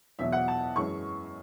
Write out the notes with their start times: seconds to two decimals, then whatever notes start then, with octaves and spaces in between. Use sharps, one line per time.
0.19 E2 B2 F#3 E5
0.32 F#5
0.48 A5
0.76 F#2 E3 G#3 C#4 C#6